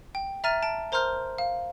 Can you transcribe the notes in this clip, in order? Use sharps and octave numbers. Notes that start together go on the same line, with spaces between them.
G5
E5 A#5 F6 A6 D#7
A5 D7
A#4 C5 A#5 C6 F6 G6
F5